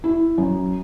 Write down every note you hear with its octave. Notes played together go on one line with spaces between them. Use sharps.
E4
F#2